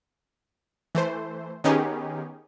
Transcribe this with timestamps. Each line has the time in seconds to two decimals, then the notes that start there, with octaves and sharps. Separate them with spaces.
0.95 E3 A3 C5
1.64 D#3 B3 C#4 D#4 G4 G#4